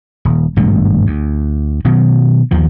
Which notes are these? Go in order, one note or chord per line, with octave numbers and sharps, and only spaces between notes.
D#1
G#1 G2 B2 A3
D2
B2 D#3 F#3
D#2 D#3 F3